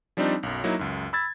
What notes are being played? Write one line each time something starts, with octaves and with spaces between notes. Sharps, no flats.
F3 G3 C4 D4 D#4
B1 F#2
F#3 A#3 D#4 E4
C#2 F#2
B5 E6 G#6 A6